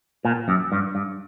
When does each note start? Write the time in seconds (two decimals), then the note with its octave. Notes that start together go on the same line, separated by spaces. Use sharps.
0.25 A#2
0.48 F#2
0.72 G2
0.95 G2